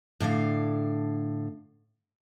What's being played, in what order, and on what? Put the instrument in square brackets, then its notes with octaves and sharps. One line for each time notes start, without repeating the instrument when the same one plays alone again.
[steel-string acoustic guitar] A2 D3 D4 F5